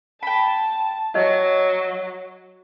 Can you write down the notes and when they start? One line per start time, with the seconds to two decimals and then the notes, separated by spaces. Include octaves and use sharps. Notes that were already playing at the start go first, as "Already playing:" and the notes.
0.23 G5 A5 B5
1.15 F#3 D#5